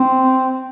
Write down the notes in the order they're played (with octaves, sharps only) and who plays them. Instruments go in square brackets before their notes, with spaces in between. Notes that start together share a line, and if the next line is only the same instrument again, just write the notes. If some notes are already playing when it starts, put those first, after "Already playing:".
Already playing: [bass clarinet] C4